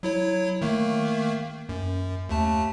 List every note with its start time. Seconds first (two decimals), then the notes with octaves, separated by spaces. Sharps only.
0.03 F#3 E4 C#5
0.61 D#3 A3 A#3
1.69 F#2
2.29 D#2 A3 A5